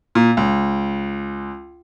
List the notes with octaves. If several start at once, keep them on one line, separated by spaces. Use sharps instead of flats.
A#2
C#2